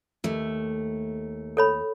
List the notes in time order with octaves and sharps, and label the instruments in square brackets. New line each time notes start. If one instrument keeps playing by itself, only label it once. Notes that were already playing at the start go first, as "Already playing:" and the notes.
[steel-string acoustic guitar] D#2 A3
[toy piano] A4 C#5 B5